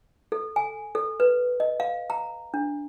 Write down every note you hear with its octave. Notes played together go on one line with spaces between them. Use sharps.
A4
G#5
A4
B4
D#5
F5
A#5
D4